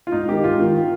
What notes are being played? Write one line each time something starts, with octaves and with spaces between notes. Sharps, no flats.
F4
G#2 D#4
D#3 G4
G#2 F4
D#3